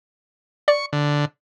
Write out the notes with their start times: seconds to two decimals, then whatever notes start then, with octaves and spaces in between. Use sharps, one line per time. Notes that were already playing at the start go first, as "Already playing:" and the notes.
0.68 D5 C#6
0.93 D3